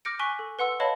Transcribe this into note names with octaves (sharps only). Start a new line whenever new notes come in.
D6 F6 G6 A#6 C#7 D7
G#5 C#6 F#6 B6 G7
A4
B4 F#5 C6 E6
B4 C#5 D#5 F5 A5 B5